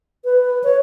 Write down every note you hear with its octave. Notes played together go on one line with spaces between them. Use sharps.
B4
C#5